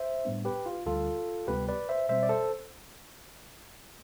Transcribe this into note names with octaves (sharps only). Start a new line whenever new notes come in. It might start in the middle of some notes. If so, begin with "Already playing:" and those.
Already playing: C5 E5
A2 G3 B3 D4
G4 B4
F4
D2 D3 G3 F4 A4
D2 C3 G3 B3 G4 B4
B4 D5
C5 E5
B2 G3 C4 C5 E5
D5
A4 C5